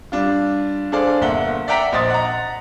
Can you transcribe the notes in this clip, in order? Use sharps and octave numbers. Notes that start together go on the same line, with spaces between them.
G3 D4 F4
D4 G#4 A4 C5 D5 F5
G1 A#3 E5 F#5 G7
D5 E5 F#5 G5 A#5 B6
A#1 C5 D#5 C6 D#6 A6
F#5 A#5